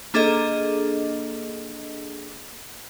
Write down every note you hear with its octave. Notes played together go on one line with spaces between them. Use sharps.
A#3 D4 G#4 A4 D#5